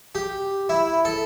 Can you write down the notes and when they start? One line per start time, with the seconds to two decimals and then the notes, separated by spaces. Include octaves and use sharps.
0.15 G4
0.69 E4
1.05 A4